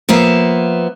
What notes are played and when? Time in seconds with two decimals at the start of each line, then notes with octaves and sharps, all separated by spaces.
0.09 F3 A#3 B3 E5